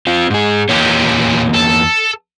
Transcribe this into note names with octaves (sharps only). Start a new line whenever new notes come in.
C4 F4
G#2 G#4
E2 A#2 A#3 G4 C#5
A4